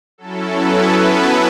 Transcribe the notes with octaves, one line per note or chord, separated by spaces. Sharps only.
F#3 C#4 E4 A4
B3 B4
A4